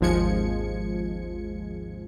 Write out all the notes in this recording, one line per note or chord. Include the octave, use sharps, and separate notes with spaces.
G#1 D#2 F3 G#3 G#6 C#7